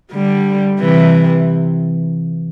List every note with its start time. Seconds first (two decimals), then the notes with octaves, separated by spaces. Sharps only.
0.12 D3 G3
0.80 C3 E3